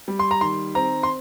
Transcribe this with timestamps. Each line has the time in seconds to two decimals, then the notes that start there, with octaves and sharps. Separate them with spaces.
0.08 G3
0.19 C6
0.31 A#5
0.41 D#3 C6
0.75 C4 A#5
1.03 C6